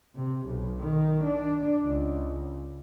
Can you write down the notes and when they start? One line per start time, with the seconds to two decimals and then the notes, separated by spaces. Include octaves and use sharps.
0.15 C3
0.46 B1
0.80 D#3
1.24 D4
1.86 C#2